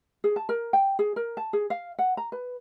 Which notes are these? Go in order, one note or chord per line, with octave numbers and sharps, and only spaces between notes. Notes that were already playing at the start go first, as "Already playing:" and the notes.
G#4
A5
A#4
G5
G#4
A#4
A5
G#4
F5
F#5
A#5
B4